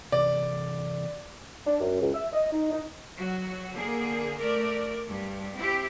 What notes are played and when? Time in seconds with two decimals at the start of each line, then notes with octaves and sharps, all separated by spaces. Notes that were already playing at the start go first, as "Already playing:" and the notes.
0.12 C3 E3 D5
1.67 D4
1.81 F#2
2.02 C#2
2.15 E5
2.33 D#5
2.53 D#4
2.72 D#4
3.17 F#3 F#4
3.74 D3 A#3 G#4
4.38 A3 A#4 D5
5.08 G2
5.57 C4 E4 G4